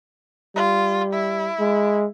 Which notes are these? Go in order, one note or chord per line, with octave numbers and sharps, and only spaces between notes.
G3 F4
E4
G#3